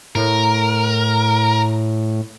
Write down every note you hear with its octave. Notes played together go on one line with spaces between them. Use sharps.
A2 A#4